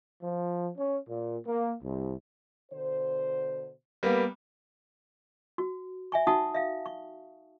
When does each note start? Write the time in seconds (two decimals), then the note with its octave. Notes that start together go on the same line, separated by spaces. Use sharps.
0.22 F3
0.76 C#4
1.08 A#2
1.46 A#3
1.83 C2
2.72 B2 D3 C5
4.03 G3 A#3 B3
5.58 F#4
6.12 E5 G#5 C#6
6.27 D#4 F#4 F#5 A5 C#6 D#6
6.54 E5 F5
6.86 C#6